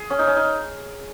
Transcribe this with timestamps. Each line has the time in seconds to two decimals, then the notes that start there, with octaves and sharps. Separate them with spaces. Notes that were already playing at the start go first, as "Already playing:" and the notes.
Already playing: G#4
0.10 C#4
0.19 D#4
0.27 C#4
0.36 D#4